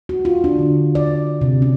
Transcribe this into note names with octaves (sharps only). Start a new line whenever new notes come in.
F#4
F4
D4
D3
D5
C3
C#4